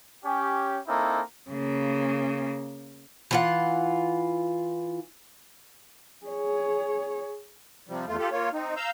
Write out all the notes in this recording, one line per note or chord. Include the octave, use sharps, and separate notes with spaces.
C#4 G4
A#3 C4 D#4 E4 A4
C#3 A#3
E3 F4 F#5
G#4 C#5
C3 F3 G3
E2 A3 F4
F4 G4 A4
A#3 F4 C#5
C4 D#4
F5 A#5 E6 G6